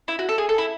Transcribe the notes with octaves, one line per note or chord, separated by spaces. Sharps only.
E4
F#4
A4
G#4
A4
E4